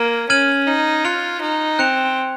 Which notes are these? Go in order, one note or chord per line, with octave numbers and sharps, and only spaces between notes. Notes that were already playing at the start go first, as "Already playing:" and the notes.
Already playing: A#3 F6 G#6 D#7
C#4 F6 G#6 D#7 F#7
D#4
F4 F#6 C#7 F7
D#4
C4 F#6 C#7 F7